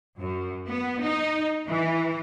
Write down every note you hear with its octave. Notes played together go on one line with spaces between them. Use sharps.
F#2
B3
D#4
E3